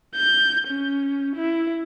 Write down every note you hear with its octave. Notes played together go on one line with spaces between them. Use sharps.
G6
C#4
E4